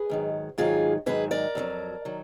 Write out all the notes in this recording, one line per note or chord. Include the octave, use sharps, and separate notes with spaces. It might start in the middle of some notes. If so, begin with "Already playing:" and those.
Already playing: G#4 B4
G#2 D#3 F#3
G#2 D#3 F#3 F4 G#4
G#2 D#3 F#3 G#4 B4
A#4 D5
F2 D#3 F#3
D#3 F#3